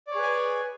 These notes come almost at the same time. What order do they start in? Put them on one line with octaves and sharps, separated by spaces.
D5 C#5 G#4 B4 G#5